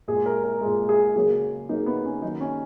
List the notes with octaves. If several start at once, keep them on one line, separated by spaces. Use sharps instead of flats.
A#2 G#3 G#4
A#4
A#4
A#2 G#3
G#4
C#3 F#3 A#3 G#4
C#3 F#3 A#3 D#4
B3
C#4
D#3 F#3 A#3 D#4
C#4